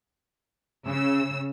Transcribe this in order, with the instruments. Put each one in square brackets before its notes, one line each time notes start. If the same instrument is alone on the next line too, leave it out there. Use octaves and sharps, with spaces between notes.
[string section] C#3 E6